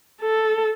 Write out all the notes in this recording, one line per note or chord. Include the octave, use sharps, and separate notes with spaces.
A4